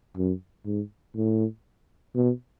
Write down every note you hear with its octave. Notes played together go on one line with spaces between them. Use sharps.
F#2
G#2
A2
B2